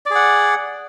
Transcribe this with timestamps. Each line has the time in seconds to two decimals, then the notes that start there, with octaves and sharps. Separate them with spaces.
0.06 D5
0.11 G#4
0.15 F#5